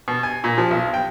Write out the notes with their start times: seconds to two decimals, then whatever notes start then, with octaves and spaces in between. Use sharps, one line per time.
0.08 B2
0.23 G#5
0.44 A#2
0.58 F3
0.71 B1
0.94 G5